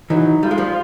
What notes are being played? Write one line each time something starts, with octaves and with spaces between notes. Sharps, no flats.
E3 F#3 D#4
G3 F4
G#3
F3 G3